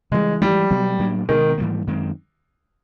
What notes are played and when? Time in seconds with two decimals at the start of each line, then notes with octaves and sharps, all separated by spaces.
0.12 C#3 E3 G3 G#3
0.41 G2 E3 G3 G#3
0.70 B2 F#3 B3
0.99 A2 F#3 A#3 D4
1.29 B2 D#3 G#3 B3
1.58 G#2 E3 G3 A#3
1.87 F#2 D#3 G#3 C4